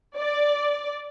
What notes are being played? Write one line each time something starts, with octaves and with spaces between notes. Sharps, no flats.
D5